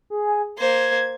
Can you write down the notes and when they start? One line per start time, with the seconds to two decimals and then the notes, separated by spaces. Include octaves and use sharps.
0.10 G#4
0.58 A#3 C5 G#6